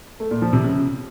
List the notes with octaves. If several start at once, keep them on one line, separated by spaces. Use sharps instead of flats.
A3
A#2
F3
C3
C#3